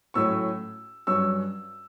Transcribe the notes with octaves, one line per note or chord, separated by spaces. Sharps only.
A2 F#3 A3 C#4 C#6 E6
G2 F#3 C#4 C#6 E6